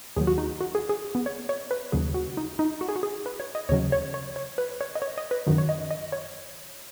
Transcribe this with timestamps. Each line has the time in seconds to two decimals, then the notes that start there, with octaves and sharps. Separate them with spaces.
0.16 D#2 D#3 F#3 G#4
0.27 F#4
0.38 D#4
0.61 F#4
0.75 G#4
0.89 G#4
1.15 B3
1.26 C#5
1.49 C#5
1.71 B4
1.92 D#2 C#3 F#3 G#4
2.14 F#4
2.37 D#4
2.59 D#4
2.81 F#4
2.89 G#4
2.96 F#4
3.03 G#4
3.26 B4
3.40 C#5
3.55 D#5
3.69 D#2 C#3 F#3 C#5
3.92 C#5
4.14 C#5
4.36 C#5
4.58 B4
4.81 C#5
4.95 D#5
5.02 C#5
5.18 D#5
5.31 B4
5.47 F#2 D#3 F#3
5.58 C#5
5.69 D#5
5.91 D#5
6.12 C#5